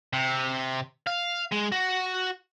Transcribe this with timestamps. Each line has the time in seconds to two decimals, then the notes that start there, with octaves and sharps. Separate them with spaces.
0.13 C3
1.07 F5
1.52 G#3
1.72 F#4